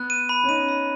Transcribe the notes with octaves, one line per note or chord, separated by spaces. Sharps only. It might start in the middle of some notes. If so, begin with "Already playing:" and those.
Already playing: B3 F#6
D#7
B5
C#4
D#4 D#7
B5